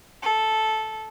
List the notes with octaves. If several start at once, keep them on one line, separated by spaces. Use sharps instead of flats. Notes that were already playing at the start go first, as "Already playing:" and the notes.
A4